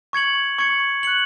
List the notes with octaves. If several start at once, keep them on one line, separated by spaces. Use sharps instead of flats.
C#6 G#6 C#7 F#7
C#6 G#6 C#7 F#7
F#6 C#7 F#7